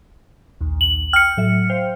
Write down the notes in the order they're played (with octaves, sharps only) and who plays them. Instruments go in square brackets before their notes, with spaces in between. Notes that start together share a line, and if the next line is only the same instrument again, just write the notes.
[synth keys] A#1 D#2
[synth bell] F#7
[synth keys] G5 [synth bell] F6 C#7
[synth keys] A2 F#3 E5
C5 F5 G5